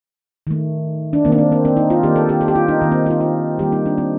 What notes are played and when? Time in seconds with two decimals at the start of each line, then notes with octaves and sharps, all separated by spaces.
0.47 D#3 A3
1.13 D4
1.25 D#3 A#3 C4
1.32 D4
1.38 C4
1.52 C4
1.65 C4
1.77 D#4
1.90 F4
2.03 D#3 A#3 G4
2.16 A4
2.29 G4
2.41 A4
2.48 G4
2.55 F4
2.68 D#4
2.81 D#3 A#3 C4
2.92 C4
3.06 F4
3.10 D#4
3.21 F4
3.59 D#3 G3 A#3 G4
3.72 D#4
3.86 D4
3.98 C4